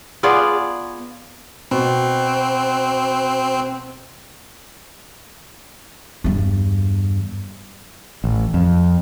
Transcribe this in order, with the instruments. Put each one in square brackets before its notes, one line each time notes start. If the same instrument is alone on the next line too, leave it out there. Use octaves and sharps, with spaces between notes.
[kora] B3 F4 G#4 D5
[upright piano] B2 [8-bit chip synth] C4
[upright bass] E2 G2
[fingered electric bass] A1
F2